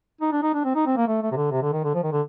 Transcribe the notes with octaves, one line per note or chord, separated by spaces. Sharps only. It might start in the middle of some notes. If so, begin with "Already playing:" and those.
D#4
D4
D#4
D4
C4
D#4
C4
A#3
A3
A3
C3
D3
C3
D3
D#3
D3
F3
D#3
D3